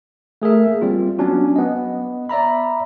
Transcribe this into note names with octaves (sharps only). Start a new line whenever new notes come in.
A3 G#4 A#4 E5
A#3
G3 C4 F4
F#3 B3 C#4 D4 F#4
B3 D#5
D5 E5 A#5 B5